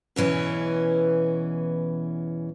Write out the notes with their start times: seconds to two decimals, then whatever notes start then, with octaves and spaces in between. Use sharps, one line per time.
0.16 E2 B2 E3 C#4 E4